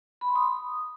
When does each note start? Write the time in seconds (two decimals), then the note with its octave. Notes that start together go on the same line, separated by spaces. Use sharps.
0.21 B5
0.28 C6
0.36 D#6